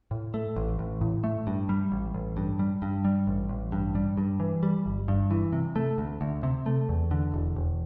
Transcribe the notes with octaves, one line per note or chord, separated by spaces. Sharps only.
A2
A3
A1
A1
A2
A3
G2
G3
A1
A1
G2
G3
G2
G3
A1
A1
G2
G3
G2
E3
G3
G1
G2
E3
C3
A3
D2
D2
C3
A3
E2
D3
E1
E1